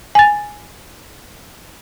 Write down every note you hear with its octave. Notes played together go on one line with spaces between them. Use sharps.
G#5 A6